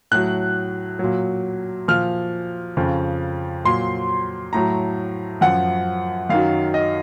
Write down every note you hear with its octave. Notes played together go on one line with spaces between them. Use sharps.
A2 F#3 F#6
A#2 F#3
A#2 F3 F6
F2 C#3 F3
A#2 F#3 C6
A2 F#3 A#5
F#2 F3 F#5
F#2 D#3 F#3 F5
D#5